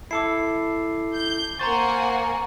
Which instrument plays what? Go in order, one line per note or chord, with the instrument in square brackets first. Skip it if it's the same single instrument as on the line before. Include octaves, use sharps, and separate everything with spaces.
[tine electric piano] E4 A4 [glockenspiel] D6 C7
[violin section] G6
[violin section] A#3 F#5 G#5 [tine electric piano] C5 A6 [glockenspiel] A#5 C#6